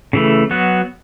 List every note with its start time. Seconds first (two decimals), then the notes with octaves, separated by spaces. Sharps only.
0.13 C#3 E3 A3
0.51 F#3 B3 F#4